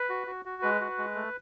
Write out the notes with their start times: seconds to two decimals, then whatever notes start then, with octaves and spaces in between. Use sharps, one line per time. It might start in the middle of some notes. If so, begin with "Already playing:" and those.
Already playing: B4
0.10 F#4
0.27 F#4
0.45 F#4
0.62 G#3 B4
0.81 F#4
0.98 G#3
1.15 A3